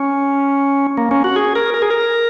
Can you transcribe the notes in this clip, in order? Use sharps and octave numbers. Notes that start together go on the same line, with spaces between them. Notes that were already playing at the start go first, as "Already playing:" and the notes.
Already playing: C#4
A#3
C#4
F#4
G#4
A#4
A#4
G#4
A#4